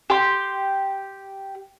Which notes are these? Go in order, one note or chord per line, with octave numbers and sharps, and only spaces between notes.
G4 C6